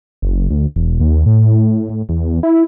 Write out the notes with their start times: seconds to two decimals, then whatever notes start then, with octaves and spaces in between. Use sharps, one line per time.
0.22 F#1
0.50 D2
0.76 E1
1.01 D#2
1.26 A2
1.90 A2
2.09 E2
2.43 E4